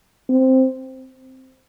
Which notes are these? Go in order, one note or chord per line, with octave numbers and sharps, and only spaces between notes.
C4